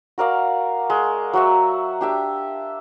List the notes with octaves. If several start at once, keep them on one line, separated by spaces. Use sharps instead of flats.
F#4 A#4 D5 F5
G#3
F#3 F#4 E5
D4 G4 E5